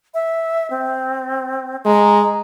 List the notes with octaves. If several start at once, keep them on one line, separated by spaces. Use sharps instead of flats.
E5
C4
G#3 A#5